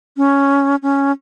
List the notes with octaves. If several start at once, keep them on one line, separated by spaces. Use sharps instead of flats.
C#4
C#4